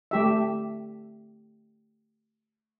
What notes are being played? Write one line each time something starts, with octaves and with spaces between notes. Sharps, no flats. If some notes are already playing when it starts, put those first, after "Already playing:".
A3 G4 E5